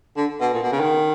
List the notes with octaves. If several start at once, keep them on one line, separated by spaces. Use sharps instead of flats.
D3
B2
A#2
B2
C#3
D#3